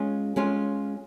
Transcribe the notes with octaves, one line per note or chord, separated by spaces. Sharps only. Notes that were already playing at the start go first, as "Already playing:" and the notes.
Already playing: G#3 C#4 F4
G#3 C#4 F4